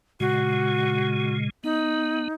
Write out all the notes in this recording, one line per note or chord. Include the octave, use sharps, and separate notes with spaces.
A#2 C#3 G#3 F#4
B3 D#4